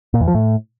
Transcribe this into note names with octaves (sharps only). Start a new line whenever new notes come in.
A#2
E2
F3
A2